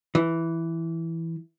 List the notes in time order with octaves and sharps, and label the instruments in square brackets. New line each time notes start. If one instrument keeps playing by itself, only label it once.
[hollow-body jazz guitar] E3